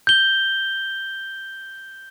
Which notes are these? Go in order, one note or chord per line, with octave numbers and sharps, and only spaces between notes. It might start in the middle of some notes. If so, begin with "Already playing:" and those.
G6 G7